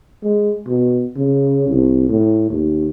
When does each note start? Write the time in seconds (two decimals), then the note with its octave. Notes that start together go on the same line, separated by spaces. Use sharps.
0.24 G#3
0.68 B2
1.17 C#3
1.68 C2
2.09 A2
2.50 D#2